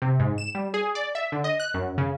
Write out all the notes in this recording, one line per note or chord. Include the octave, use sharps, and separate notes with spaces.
C3
G#2
E7
G3
G#4
D5
E5
D3
D#5
F#6
F#2
C#3